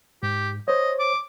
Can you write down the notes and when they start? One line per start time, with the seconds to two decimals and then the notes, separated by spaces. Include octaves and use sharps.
0.23 G#2 G4
0.68 C5 C#5 D#5
0.99 D6